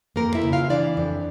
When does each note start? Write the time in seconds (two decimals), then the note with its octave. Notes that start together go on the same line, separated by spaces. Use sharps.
0.16 F2 A#3 A#4
0.35 E4 E5
0.44 C#3
0.52 F4 F5
0.70 E3 D4 D5
0.97 F2